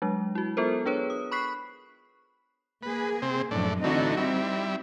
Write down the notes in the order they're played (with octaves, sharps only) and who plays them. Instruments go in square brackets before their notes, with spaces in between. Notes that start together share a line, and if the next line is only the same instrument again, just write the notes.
[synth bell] F#3 G#3 D4
E4 F#4
B3 F4 A4 A#4 C5
D4 G#4 B4 C#5
D#6
B5 C#6 F#6 B6 C7
[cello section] A#3 G#4 [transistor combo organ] B4
[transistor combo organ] C3 C4
[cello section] F#2 F3 [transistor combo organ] A2 D4
[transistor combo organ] D3 E3 A3 [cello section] C4 D#4 F#4
[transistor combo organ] G3 E4 [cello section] C4